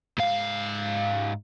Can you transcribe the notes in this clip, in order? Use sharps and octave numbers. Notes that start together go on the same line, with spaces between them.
G#2 F5